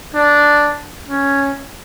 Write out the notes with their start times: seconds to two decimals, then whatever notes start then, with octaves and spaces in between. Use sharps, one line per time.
0.14 D4
1.08 C#4